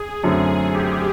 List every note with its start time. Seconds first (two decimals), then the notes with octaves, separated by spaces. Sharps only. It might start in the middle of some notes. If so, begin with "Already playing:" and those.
Already playing: G#4
0.24 F#2 D3 F#3 A3 C4
0.74 G4